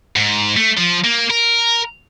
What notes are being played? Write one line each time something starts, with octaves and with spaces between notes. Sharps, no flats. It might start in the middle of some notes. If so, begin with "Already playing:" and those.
G#2
A3
F3
A#3
A#4